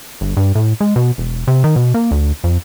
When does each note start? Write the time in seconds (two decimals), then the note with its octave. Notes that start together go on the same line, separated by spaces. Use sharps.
0.21 G1
0.37 G2
0.55 A2
0.81 G#3
0.96 B2
1.18 E1
1.48 C3
1.64 D#3
1.76 B2
1.94 A#3
2.11 D2
2.44 F2